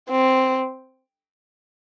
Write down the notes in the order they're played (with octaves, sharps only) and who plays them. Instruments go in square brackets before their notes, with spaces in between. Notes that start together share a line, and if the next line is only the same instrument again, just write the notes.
[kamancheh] C4